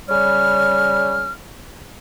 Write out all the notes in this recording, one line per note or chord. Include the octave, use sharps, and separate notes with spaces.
C#3 G3 C#5 F6